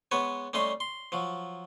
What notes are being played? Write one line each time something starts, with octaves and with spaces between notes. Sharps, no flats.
G#3 B3 B4 C#5
G3 A3 C#4 D#5 C6
C6
F3 F#3